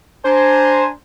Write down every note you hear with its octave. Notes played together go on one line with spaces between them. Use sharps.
D4 C5 G#5 A#5